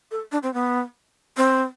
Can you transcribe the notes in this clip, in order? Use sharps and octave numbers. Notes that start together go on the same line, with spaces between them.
A4
D4
C4
B3
C4